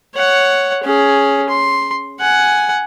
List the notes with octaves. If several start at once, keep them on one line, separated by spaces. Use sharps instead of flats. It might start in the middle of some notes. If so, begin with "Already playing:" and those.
C#5 F#5
C#4 G#4
C6
F#5 G#5